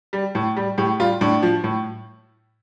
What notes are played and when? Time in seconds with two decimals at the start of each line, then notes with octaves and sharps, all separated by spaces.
0.13 G3
0.35 A2
0.57 G3
0.78 A2 G4
1.00 G3 F4
1.21 A2 D4
1.43 F3
1.64 A2